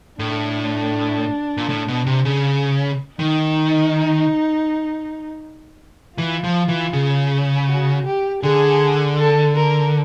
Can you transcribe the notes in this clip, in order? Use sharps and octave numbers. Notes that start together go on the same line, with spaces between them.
A2 D4
A#2
A2
B2
C3
C#3
D#3 D#4
E3 F4
F3
E3
C#3
F#4
G4
D3 G#4
A4
A#4